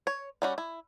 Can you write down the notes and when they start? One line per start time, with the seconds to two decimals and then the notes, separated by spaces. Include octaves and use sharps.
0.07 C#5
0.42 G3 C#4 F#4
0.58 E4